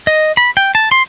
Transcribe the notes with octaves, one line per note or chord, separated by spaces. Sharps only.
D#5
B5
G5
A5
C6